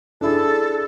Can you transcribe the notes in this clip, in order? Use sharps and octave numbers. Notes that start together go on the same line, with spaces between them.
D4 E4 G#4 A4